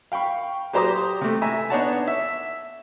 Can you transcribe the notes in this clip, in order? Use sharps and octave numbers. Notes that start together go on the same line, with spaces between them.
F5 G5 B5 C#6
F#3 G4 C5 A#5 D6 D#6
C3 A3
E5 G#5 A#5
B3 D4 D#4 C#5 F#5 A5
E5